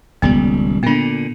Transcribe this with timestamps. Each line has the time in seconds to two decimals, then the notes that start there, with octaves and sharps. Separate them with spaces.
0.22 D#1 C#2 G3 B3
0.83 A#2 D3 B3 D4